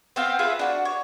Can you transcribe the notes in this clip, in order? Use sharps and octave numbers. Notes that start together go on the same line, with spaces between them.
B3 C4 F5 G5
F4 G#4 B4 E5
D4 F#4
C#5